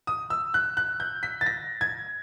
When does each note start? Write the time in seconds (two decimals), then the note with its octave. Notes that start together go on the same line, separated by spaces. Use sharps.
0.07 D#6
0.30 E6
0.54 F#6
0.77 F#6
1.00 G6
1.23 B6
1.41 A6
1.46 A#6
1.81 G#6